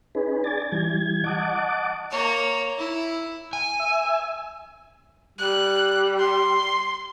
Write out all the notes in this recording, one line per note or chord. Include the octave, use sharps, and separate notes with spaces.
C#4 D#4 G#4 B4
D5 G#5 A6
E3 G3 G#6
D#5 F#5 A5 D6
A#3 C#5
E4
G#5
E5
G3 F#6
C6